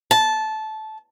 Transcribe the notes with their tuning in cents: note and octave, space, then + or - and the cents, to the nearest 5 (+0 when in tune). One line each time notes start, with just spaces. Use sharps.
A5 -15